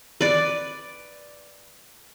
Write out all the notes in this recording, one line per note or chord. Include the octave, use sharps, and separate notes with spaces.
B4 D5